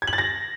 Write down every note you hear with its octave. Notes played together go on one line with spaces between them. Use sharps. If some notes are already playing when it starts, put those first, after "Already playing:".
G#6
F#7
A6
A#6